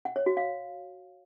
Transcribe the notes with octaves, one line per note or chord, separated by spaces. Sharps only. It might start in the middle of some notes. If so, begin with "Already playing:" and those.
F#5
C#5
F#4
F5